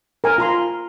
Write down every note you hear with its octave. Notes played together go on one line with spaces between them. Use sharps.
A#4 G#5
F4 A#5 C6